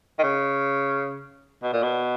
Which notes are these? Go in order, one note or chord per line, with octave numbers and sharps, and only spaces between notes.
D#3
C#3
B2
A#2
B2